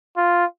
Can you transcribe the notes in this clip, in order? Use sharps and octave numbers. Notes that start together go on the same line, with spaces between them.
F4